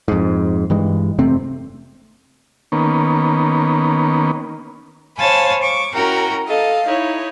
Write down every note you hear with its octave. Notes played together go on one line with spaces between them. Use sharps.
F2 G#2
G2 E3 G#3
F1 C3 A3 C4
D#3 A#3 B3 C#4
C5 C#5 F5 G#5 A5 B5
C#6 D6
C#4 E4 F#4 A#4 G5 A#5
A4 D#5 F5
D#4 E4 C#5